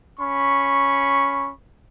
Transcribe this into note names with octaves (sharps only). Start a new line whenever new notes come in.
C#4 B5 C#6